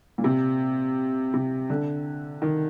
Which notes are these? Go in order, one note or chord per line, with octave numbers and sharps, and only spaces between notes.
A#2
C3
C3
D3
D#3